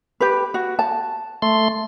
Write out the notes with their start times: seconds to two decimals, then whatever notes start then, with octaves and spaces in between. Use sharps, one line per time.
0.20 G4 B4
0.54 F#4
0.79 A5
1.42 A3 C6